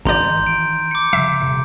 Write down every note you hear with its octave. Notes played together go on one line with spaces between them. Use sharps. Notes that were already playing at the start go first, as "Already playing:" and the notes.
G#1 D#3 E3 D4 D5 A#5 C6 G6
D#3 E3
D7
D6 C#7
C#3 F3 G3 E5 B6 C7
D#1 C3